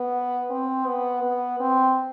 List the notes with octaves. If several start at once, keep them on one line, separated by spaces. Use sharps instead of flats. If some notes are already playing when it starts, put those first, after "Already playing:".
Already playing: B3
C4
B3
B3
C4